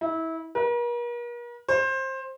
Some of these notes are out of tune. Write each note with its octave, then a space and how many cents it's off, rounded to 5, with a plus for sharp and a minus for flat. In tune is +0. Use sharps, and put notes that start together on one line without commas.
E4 -25
A#4 +45
C5 +20